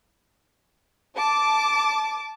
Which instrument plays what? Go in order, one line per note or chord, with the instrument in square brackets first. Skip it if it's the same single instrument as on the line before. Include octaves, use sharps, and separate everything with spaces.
[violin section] A5 D6